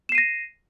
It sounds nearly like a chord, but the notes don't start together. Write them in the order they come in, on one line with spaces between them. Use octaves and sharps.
E7 C7 D#7 A#6